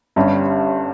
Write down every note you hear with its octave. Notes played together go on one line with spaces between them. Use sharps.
G1 G2 G3 C#4